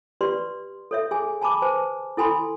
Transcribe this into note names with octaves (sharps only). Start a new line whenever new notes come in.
G4 B4 D5 C6 C#6
A4 C#5 E5
G#4 G#5
G#5 A5 B5 D6
B4 C5 G#5 A5
E4 A4 G#5 B5 C6